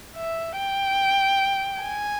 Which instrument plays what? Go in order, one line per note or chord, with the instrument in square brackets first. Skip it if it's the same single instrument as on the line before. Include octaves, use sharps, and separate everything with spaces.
[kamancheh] E5
G5
G#5